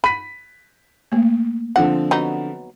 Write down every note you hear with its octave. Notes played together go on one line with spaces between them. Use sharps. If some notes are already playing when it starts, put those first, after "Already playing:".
B5 B6 D#7
A3 A#3
D3 F3 C4 F#5
F#3 B3 D#4